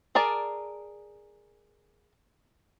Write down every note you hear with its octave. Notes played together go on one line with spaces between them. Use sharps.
G#4 A#4 D5 A5